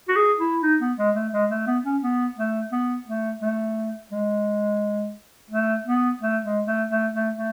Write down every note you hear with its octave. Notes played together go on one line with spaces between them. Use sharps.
F#4
G#4
E4
D#4
B3
G#3
A3
G#3
A3
B3
C#4
B3
A3
B3
A3
A3
G#3
A3
B3
A3
G#3
A3
A3
A3
A3